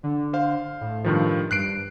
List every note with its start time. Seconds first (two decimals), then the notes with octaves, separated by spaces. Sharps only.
0.03 D3
0.33 C5 F5
0.81 A2
1.04 G2 D#3 F3
1.51 G2 F#6 C7 D7